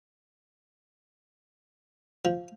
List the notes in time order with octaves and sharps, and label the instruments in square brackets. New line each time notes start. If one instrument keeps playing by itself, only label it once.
[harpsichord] F3